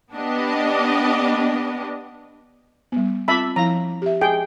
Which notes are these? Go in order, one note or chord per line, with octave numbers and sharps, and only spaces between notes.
B3 D4 G4 D#5
G3 B3
C4 F4 E5 A5 B5 D6
F3 E4 F5 A#5
G4 E5
G#4 G5